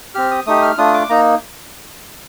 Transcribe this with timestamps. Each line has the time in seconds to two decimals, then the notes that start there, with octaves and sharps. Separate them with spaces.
0.15 C4 G4 F6
0.31 D#6
0.46 A3 D#4 G4 D#6
0.62 F6
0.78 A3 D4 F4 D#6
0.94 D6
1.09 A#3 D#4 A#5